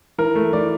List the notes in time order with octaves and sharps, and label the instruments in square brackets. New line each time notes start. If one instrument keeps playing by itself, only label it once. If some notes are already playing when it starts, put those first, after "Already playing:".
[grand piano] E3 A#4
A3
E3 D5